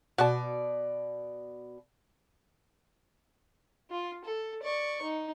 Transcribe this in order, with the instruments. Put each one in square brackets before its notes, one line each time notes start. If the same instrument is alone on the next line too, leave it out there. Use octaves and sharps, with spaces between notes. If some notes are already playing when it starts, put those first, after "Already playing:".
[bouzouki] B2 D5 [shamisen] F#4 A5
[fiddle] F4
A4
D5 C#6
D#4